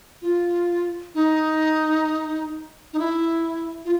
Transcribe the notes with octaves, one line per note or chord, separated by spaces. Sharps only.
F4
D#4
D#4
E4
F4